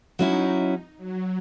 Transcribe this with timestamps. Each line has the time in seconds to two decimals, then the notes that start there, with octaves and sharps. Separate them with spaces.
0.18 F#3 C#4 D#4 E4
0.97 F#3